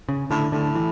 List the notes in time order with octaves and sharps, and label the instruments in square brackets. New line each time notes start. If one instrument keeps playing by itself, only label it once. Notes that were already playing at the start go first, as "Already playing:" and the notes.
[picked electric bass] C#3
[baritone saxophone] A2 [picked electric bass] D3
[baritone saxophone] A2 [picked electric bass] D3
[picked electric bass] E3